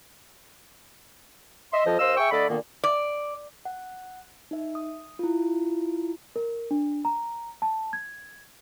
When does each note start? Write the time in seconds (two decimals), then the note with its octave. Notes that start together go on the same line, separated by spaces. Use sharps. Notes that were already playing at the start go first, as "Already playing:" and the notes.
1.73 D#5 E5 C6
1.85 F2 F3 D#5
2.00 D#2 C5 D#5 F5 E6
2.17 G#4 E5 G5 C#6
2.32 D3 A3 A4 D5 D#5 B5
2.49 A#2 D3 D#3 A#3 B3
2.84 D5
3.65 F#5
4.51 D#4 E5
4.75 D#6
5.19 E4 F4
6.36 A#4
6.71 D4
7.05 A#5
7.62 A5
7.93 G#6